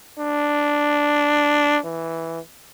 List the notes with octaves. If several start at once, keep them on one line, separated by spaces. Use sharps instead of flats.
D4
E3